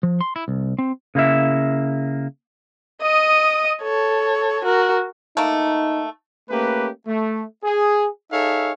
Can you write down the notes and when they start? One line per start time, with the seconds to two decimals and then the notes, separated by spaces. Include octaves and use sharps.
0.03 F3
0.21 C6
0.36 E4
0.48 C2
0.78 C4
1.15 C#3 A#3 E4 E5
3.02 D#5 D#6
3.83 A4 C#5
4.64 F#4 A#4
5.37 A3 A#3 D#4
6.50 A3 A#3 C#4 G4 B4
7.07 A3
7.64 G#4
8.32 D#4 G#4 A4 C#5 E5 F5